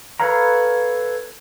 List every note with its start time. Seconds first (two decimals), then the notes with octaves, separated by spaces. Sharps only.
0.20 A4 B4 C#5 F5 A#5